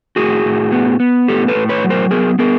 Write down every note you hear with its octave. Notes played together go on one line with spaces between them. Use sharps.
A2 F#4 G#4
A2
B3
B3
A2 G4 A4
A4 B4
A2
B4 C#5
F#3
A#4 C5
B3 G#4 A#4
B3 G#4 A#4